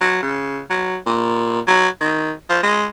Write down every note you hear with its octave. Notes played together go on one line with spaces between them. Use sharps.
F#3
C#3
F#3
A#2
F#3
D#3
F3
G#3